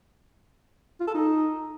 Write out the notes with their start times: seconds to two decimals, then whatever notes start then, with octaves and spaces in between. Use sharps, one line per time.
1.00 F4
1.07 A4
1.15 D#4